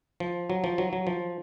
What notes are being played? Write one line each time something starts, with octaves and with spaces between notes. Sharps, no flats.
F3
F#3
F3
F#3
F#3
F3